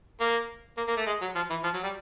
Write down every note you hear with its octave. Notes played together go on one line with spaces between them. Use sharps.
A#3
A#3
A#3
A3
G#3
F#3
F3
E3
F3
F#3
G3